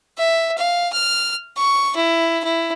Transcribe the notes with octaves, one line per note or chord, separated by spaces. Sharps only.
E5
F5
F6
C#6
E4
E4